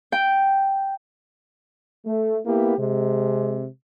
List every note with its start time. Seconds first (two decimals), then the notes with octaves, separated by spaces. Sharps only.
0.12 G5
2.07 A3
2.46 A#3 B3 E4 G4
2.78 C3 G#3